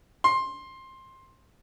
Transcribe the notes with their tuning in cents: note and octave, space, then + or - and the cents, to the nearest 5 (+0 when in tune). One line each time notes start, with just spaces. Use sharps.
C6 +15